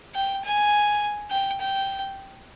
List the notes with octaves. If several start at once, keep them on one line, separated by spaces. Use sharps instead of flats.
G5
G#5
G5
G5